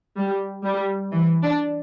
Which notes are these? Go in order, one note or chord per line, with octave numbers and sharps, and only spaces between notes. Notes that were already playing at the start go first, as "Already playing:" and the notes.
G3
G3
E3
D4